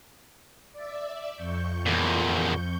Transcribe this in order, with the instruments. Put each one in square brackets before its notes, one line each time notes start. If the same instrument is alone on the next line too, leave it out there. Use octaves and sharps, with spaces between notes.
[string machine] D5 E5
F2 C#6 G6
[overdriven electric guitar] E2 A#2